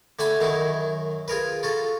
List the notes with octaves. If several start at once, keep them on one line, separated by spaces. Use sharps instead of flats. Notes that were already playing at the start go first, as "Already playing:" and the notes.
D3 A3 E5 F#5 G#5 B5
F#2 D#3 F#3 D#4 E4
F4 G#4 A#4 B4
F4 F#4 A4